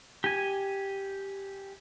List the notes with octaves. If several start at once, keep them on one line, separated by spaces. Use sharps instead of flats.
G4 G#5